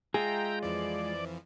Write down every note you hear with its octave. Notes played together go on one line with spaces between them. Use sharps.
G#3 F4 G#4 E5 G5 A#5
F2 E3 F3 D5